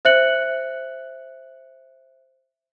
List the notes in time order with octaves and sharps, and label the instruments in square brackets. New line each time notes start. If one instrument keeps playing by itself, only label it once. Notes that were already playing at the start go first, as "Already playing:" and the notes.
[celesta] C5 E5 F#6 C#7 F#7